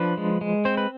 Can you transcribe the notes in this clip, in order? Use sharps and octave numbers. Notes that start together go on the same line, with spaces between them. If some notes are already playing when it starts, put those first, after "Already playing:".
Already playing: F3 D4 B4
G#3
G#3
C4 C5
B4